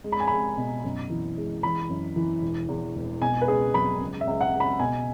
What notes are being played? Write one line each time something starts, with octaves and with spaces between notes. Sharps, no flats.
G#3
B5
G#5
G#3 B5
B2
F#2
E3
G#3
E3 B5
F#2
E3
E1
E2
E1
B2 G#5
B4
C#2 G#4
F#3 B5
C#2
E5
C#2
F#5
C#2
B5
B2 G#5